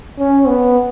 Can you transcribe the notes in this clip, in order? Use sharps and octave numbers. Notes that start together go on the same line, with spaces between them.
C#4
B3